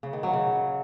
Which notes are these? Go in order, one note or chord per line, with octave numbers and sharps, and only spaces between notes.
C#3
D#3
F#3
C#3